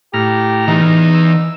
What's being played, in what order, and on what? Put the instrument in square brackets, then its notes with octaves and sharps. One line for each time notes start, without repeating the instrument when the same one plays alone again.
[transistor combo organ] A2 A#5 F6 [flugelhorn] G4
[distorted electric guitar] E2 E3 [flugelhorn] D#4
[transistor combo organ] E6